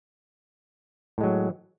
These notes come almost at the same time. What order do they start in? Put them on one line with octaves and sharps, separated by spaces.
A2 G#3 F#3